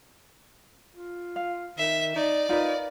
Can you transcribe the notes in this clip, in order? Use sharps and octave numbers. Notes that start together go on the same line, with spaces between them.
F4
F5
D#3 E5
D#4 D5
D#4 F4 A#4 B4